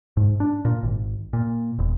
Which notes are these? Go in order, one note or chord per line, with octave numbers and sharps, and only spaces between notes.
G#2
D4
A#2
G#1
A#2
E1